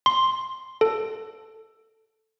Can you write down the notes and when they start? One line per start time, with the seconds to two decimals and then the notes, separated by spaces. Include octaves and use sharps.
0.06 C6
0.81 A4